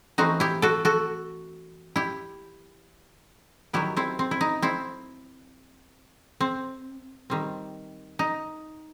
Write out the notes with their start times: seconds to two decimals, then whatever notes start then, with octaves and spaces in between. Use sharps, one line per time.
0.18 E3 A3 C4 D#4 F#4
0.40 E4 G4
0.62 F#4 A4
0.85 F#4 A4
1.96 E4 G4
3.73 D#3 F#3 B3 E4 G4
3.97 C4 E4
4.19 C4
4.31 E4
4.41 D#4
4.62 C4 E4
6.40 C4
7.30 D#3 G3 C4
8.19 D#4